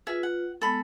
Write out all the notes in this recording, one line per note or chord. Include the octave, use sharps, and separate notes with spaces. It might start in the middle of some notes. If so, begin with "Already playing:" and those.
F4 G#4 B4 E5
F#5
G#3 B3 A4 B5